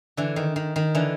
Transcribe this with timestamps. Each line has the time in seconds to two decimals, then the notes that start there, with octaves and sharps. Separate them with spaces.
0.17 D3 E3
0.36 D#3
0.56 D#3
0.76 D#3
0.95 D3 E3